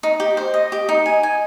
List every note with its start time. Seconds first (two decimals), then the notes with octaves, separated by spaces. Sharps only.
0.03 D#4
0.20 G4
0.37 C5
0.54 D#5
0.72 G4
0.89 D#4
1.06 G#5
1.23 G#5